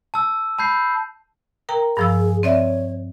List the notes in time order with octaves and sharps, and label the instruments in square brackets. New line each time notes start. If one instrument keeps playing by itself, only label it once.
[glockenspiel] A5 E6
A5 B5 G6 C7
[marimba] A#4 G5 A#5
[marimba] G2 F3 E6 [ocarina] G#4
[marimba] C4 D5 E5 [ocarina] C#5